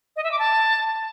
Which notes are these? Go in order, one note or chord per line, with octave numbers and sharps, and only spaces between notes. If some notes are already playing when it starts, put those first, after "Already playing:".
D#5
E5
D6
A5